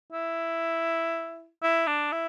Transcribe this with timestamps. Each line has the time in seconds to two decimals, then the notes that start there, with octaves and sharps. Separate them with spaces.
0.13 E4
1.63 E4
1.87 D4
2.12 E4